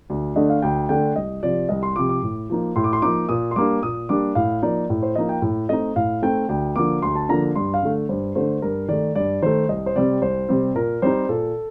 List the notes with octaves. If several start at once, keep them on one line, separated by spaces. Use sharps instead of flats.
D2
D3 A3 D4 D#5
F5
D2 G5
D3 A3 D4 G5
C2 D#5
C3 F3 D5
C2 D#5
C6
C3 F3 D6
D6
A2
F3 A#3 D#4
A2 C6
D6
C6
F3 A#3 D#4 D6
A#2 D#6
C6
G3 A#3 D4 D6
A#2 D#6
G3 A#3 D4 D6
A2 F5
F3 A#3 D#4 D5
A2
C5
F3 A#3 D#4 D#5
G5
A2
A3 C4 D#4 D#5
A2 F5
A3 C4 D#4 G5
D2 G5
D3 F3 A#3 D6
D2 C6
A5
D3 F3 A#3 A#5
G2 C6
F5
D3 A3
G2 C5
D3 A3 C5
G2 A#4
D#3 A3 D5
G2 D5
D#3 A3 C5
C2 D#5
C5
C3 G3 C4 D5
C2 C5
C3 G3 C4
A#2 A#4
G3 C4 D#4 C5
A#2 A4